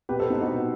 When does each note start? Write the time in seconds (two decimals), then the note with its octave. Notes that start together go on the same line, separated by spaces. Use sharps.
0.09 B2 G4 B4
0.19 A4 C5
0.30 B3 D#4
0.41 D#4 F#4
0.52 B2